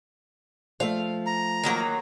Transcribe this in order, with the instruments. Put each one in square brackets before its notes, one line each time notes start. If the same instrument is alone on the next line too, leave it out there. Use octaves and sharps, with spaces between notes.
[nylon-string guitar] F3 A3 [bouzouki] F5
[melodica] A#5
[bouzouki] D#3 F#3 A#3